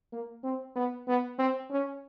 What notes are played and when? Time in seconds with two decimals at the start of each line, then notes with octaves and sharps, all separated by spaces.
0.12 A#3
0.44 C4
0.76 B3
1.07 B3
1.39 C4
1.70 C#4